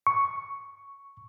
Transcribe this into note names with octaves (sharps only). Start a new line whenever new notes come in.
C#6